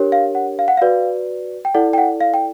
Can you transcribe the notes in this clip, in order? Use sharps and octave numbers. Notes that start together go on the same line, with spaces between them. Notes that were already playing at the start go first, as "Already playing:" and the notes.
Already playing: D4 G4 A#4 C#5
F5
F#5
F5
F#5
F#4 B4 D5 F5
G5
E4 A4 D5 F#5
G5
F#5
F5
G5